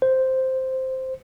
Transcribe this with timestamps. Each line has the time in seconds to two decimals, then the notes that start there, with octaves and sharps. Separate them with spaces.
0.02 C5